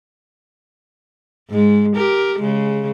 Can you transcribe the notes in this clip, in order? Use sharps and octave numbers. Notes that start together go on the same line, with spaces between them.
G#2 G#3
G4 A#4
C#3 G#3